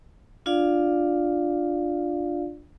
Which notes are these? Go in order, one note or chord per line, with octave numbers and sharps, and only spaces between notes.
D4 F4 D5 F5